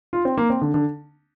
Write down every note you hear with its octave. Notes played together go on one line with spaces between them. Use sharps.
F4
C4
A#3
C4
D3
D3